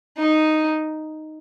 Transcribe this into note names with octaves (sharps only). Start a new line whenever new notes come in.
D#4